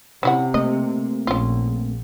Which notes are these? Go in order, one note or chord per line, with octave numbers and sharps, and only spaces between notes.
C3 C#4 E4 F#5
A3 A#3 C4 D#5
A#1 C#4 F4